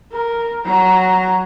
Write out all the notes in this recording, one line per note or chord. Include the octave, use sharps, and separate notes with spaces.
A#4
F#3 A#5